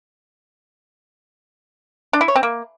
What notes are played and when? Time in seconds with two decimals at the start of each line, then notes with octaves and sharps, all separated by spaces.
2.13 D4
2.21 E4
2.28 C#5
2.36 C4
2.43 A#3